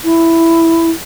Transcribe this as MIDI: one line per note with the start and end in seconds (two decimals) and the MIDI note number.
0.03 0.90 64